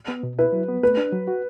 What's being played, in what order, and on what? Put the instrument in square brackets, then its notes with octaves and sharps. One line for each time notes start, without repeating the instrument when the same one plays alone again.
[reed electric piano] B3
B2
[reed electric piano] E4 [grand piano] B4
[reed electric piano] F#3
B3
[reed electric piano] A3 [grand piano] B4
[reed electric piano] D4
F#3
F#4